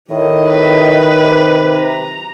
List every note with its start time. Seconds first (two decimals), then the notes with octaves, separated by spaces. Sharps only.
0.11 A2 D#3 G4 D#5
0.48 B4
1.23 C3
1.77 A#5